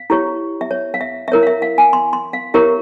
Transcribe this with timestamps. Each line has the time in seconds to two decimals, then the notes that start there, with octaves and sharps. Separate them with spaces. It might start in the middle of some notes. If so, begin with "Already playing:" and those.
Already playing: F5
0.10 E4 G4 C#5
0.61 E5
0.71 C#5
0.94 F5
1.01 E5
1.28 E5
1.32 E4 A#4 C#5
1.43 F5
1.47 E5
1.62 F5
1.78 G#5
1.93 C6
2.13 C6
2.33 F5
2.54 E4 G4 A#4 C#5 E5